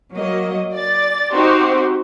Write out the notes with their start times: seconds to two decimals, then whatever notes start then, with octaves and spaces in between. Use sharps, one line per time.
0.13 F#3 A#3 D#5
0.71 D5 A6
1.32 C4 D#4 F#4 G4 C5